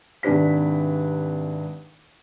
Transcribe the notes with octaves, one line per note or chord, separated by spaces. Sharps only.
G#1 C3 D4 B4 B6